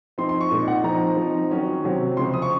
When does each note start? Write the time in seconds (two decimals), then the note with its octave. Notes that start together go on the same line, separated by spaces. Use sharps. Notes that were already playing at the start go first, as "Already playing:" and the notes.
0.18 F3 C4 D#4 C6
0.29 C6
0.41 C#6
0.51 A#2 G#3 D#4
0.68 F#5
0.84 F3 C4 D#4 A#5
1.17 F3 C4 D#4
1.51 D#3 F#3 C#4
1.84 C3 F#3 C4
2.17 C#3 F3 G#3 C4 C6
2.34 D#6
2.42 C#6